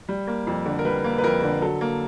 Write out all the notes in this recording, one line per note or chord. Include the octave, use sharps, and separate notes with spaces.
G3
A#3
F2
D3
A#4
G3 B4
A#3
B4
F2 A#4
D3
F#3 A4
A#3